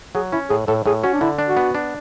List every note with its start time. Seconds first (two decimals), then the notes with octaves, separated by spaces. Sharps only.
0.15 F#3 G#4
0.32 C#4 E4
0.50 A2 G#4
0.68 A2 A4
0.86 A2 G#4
1.03 C#4 F#4
1.13 D4
1.21 D3 E4
1.39 D4
1.48 F#4
1.57 B3
1.75 D4